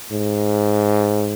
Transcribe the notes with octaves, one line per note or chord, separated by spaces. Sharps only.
G#2